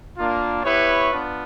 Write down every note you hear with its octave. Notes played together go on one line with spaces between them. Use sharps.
A#3 D4 F4
B3 E4 G4 B4 C#5
B3 D4 F4